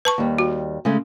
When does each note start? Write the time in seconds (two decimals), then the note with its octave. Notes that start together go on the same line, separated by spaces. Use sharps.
0.05 B4 A5 C#6
0.18 D#2 G3
0.38 F#4
0.85 C#3 G#3 A3